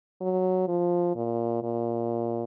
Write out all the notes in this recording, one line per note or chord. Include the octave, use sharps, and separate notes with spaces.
F#3
F3
A#2
A#2